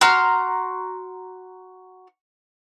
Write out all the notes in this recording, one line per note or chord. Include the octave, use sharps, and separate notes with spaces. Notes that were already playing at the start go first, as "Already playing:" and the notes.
F#4 A#5 C6 F6